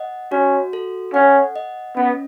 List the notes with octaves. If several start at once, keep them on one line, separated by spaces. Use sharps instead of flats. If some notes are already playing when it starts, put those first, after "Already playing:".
Already playing: D#5 F#5
C#4 F#4
A4
C#4 F#5
D#5
B3 C#4